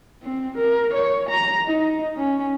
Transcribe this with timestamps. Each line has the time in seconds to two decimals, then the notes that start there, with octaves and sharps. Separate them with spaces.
0.23 C4
0.58 A#4
0.94 C#5
1.30 A#5
1.66 D#4
2.17 C#4